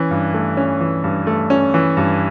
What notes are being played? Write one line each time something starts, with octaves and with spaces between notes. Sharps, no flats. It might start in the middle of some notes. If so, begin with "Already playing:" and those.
Already playing: E3 C#4
G2
A3
C#4
E3
G2
A3
C#4
E3
G2